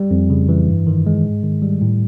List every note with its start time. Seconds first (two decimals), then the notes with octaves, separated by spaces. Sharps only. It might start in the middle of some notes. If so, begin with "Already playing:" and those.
Already playing: G3
0.11 F2
0.30 C#3
0.49 E3
0.69 G2
0.87 D#3
1.06 G#3
1.24 G#2
1.43 D#3
1.62 G3
1.81 A2